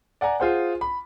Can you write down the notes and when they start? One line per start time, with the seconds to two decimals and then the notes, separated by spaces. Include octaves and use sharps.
0.21 D5 F#5 G#5 A#5
0.40 F4 G#4 C5 F#5
0.81 B5